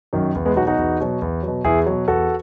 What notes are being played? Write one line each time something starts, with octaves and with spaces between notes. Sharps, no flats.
F#2 D#3 F#3
E2
G#3 B3
B2 F#3 D#4 F#4
D#4 F#4
E2
B2 F#3
E2
B2 F#3
E2 E4 G#4
B2 F#3
E2 F#4 A4